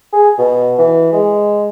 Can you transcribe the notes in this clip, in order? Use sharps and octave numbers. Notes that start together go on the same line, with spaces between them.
G#4
B2
E3
G#3